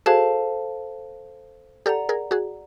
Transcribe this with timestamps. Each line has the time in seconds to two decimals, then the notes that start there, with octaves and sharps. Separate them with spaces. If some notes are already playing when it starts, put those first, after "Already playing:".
0.06 F#4 G#4 A4 C5 F5 A5
1.86 G4 A4 D5 F#5 A#5
2.09 G#4 A#4
2.31 F#4 G#4